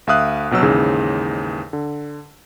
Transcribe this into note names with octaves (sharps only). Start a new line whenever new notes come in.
D2 E5 F5 D#6 F#6
A#1 B2 F#3 E6
D#2 G#2 C#3 E3
D3